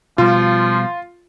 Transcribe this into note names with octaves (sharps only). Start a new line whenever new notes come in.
B2 F3 G3 F4